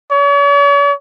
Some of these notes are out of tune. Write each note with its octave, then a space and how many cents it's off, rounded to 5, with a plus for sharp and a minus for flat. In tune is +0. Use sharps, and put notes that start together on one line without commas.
C#5 +45